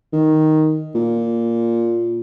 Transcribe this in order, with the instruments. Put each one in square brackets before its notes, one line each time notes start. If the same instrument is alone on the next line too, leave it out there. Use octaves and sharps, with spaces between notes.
[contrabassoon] D#3
A#2